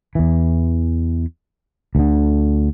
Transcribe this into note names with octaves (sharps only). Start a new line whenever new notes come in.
E2 E3
D2 D3